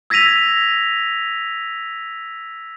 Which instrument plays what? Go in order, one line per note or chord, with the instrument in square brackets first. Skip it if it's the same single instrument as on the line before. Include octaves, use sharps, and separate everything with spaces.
[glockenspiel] E6 G#6 A#6 B6 D#7 F7